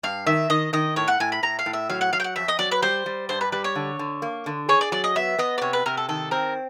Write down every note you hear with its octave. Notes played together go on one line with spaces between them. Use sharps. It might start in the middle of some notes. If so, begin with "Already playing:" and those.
G2 F5
D#3 E5
D#3 D#5
D#3 D#5
A2 C#5
F#5
A2 G#5
B5
A2 A#5
F5
A2
E5
F#3 F5
F#5
F#3 F5
G5
F#5
F2 E5
D#5
F#3 D5
B4
G3 C5
G3
G2 C5
B4
G3 B4
C#5
D3
D3
A#3
D3
G#4 C#5
D5
F#3 D5
D#5
B3 E5
B3 D#5
D5
C3 C#5
B4
C3 A#4
A4
D#3 A4
C4 A#4